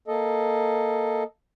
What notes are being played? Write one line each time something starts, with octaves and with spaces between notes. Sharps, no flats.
A#3 A4 D#5